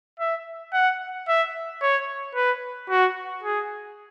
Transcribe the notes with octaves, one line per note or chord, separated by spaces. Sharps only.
E5
F#5
E5
C#5
B4
F#4
G#4